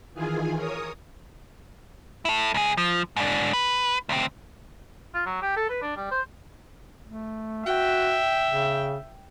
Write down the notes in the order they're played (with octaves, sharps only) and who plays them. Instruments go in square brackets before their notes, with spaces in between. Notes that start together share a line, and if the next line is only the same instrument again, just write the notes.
[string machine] D#3 E3 F4 G#4 G#5
A#4 C#5 D#6
[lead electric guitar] E4 A4
C#2 G#4
F3
G#2 D4
B4
D2 C4
[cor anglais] F4
F#3
G4
A4
B4
D4
G3
C5
[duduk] A3
[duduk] F#4 [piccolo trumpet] E5 [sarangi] G5
[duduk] C#3